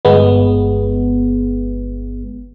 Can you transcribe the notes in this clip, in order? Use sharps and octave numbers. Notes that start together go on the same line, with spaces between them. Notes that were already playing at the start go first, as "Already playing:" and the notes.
G1 G#3 B3